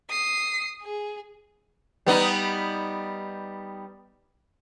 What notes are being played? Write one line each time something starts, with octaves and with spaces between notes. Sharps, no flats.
D#6 C7
G#4
G3 B3 D#4